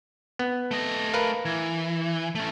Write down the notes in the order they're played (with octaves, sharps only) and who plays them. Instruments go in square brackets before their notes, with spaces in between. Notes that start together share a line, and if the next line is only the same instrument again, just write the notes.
[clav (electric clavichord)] B3
[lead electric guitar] A3 D#5
[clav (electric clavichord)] A#4 B4 F5
[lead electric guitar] E3
A3 C#4